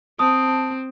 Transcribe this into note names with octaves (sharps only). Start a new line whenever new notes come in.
C4 A5 D#6